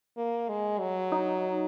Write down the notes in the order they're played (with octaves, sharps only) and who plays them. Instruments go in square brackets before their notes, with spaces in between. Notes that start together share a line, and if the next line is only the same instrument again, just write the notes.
[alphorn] A#3
G#3
F#3
[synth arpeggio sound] D#4